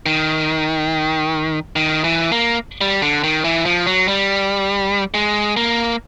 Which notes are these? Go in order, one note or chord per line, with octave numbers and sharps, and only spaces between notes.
D#3
D#3
E3
A#3
G3
D3
D#3
E3
F3
F#3
G3
G#3
A#3